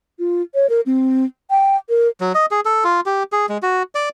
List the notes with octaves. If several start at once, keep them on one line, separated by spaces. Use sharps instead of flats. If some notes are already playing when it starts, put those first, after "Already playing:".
F4
C#5
A#4
C4
G5
A#4
F#3
D#5
G#4
A4
F4
G4
G#4
G#3
F#4
D5